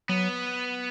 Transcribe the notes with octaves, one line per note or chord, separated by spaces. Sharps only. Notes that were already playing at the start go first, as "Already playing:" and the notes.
F#3 B3